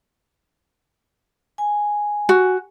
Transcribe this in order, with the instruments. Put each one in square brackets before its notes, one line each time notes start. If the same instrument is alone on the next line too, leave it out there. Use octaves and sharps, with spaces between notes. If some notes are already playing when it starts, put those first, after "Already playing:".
[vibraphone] G#5
[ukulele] F#4